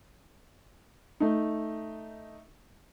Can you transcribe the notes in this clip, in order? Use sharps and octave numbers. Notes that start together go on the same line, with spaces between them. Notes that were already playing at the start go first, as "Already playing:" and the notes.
A3 D#4